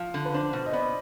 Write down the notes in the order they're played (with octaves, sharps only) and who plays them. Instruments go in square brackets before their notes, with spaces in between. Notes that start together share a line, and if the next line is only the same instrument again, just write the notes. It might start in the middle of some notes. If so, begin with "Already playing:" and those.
Already playing: [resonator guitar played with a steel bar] F3 [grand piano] F4
[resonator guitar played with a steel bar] D3
[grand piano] B4
[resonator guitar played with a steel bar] D4 [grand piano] C5
[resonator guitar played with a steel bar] B2
[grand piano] D#5
[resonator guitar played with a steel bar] B3 [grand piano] D5